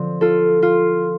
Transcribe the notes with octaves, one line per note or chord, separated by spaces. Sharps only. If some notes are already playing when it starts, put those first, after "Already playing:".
Already playing: D3 F3 C4
F4 A4
F4